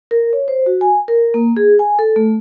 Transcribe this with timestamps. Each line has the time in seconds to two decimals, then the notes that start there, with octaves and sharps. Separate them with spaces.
0.11 A#4
0.33 C#5
0.48 C5
0.66 F#4
0.81 G#5
1.08 A#4
1.34 A#3
1.57 G#4
1.79 G#5
1.99 A4
2.16 A3